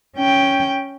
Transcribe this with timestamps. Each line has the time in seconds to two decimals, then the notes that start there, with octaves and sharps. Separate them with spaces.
0.17 C#4 G5